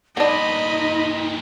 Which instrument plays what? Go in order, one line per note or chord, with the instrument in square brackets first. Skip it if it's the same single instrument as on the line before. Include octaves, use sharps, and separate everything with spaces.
[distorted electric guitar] G2 A#2 [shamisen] B3 D4 [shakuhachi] D#4 [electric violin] D#5 B5